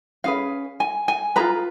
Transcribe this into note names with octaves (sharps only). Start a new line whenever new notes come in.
C#4 G#4 B4 F5
G#5
G#5
F4 G#4 B4 A#5